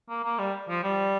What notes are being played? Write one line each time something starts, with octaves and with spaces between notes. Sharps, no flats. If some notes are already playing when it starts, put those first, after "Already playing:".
A#3
A#3
G3
F3
G3